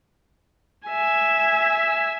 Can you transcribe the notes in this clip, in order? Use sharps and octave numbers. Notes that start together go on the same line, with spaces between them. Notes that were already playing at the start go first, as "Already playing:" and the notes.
E5 G#5